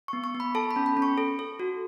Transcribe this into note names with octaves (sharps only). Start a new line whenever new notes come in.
B3 C#6
C#6
B3
B5
A4 A5
B5
C#4
B5
C#4
C#6
A4
A4
F#4